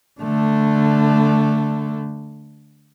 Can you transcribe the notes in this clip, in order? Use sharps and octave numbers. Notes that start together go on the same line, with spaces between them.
D3 A3